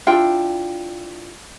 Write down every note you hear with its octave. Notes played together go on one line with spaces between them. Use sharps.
D4 E4 F4 G5